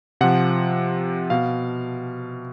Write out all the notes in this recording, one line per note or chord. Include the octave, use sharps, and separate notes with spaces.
C3 F3 F#5
B2 F5